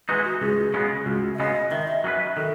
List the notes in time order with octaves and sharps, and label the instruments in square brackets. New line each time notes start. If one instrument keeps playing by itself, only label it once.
[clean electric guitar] E3 G#3 D#4 F#4 [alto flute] B4
[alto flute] F#4
[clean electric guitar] C#2 [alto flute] G#4
[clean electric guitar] C#3 G#3 B3
[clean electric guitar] C#2 [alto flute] F#4
[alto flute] E5
[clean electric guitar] C#3 G#3 B3 [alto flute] D#5
[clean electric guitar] D#3 [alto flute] E5
[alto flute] D#5
E5
[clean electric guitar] F#3 C#4 G#4 B4
[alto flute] E5
[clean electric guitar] D#3 [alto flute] A4